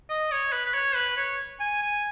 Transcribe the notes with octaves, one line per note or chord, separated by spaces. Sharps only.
D#5
C#5
B4
B4
C#5
B4
C#5
G#5
G#5